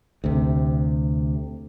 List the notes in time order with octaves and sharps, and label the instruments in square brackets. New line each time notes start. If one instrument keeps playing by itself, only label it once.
[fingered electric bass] D2 C3